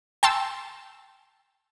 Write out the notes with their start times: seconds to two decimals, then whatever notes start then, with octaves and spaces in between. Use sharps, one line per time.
0.23 G5 A5 C6 E6